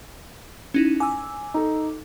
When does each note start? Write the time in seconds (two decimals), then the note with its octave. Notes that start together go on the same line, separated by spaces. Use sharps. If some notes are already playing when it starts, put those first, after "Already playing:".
0.74 C#4 D#4 E4
1.00 G#5 D6 E6
1.54 D#4 A4